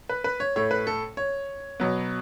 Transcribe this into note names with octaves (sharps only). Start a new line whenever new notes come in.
B4
B4
C#5
A2 A3 C#5
B4
A4
C#5
B2 F#3 B3